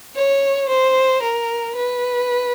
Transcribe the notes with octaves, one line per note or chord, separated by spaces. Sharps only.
C#5
C5
A#4
B4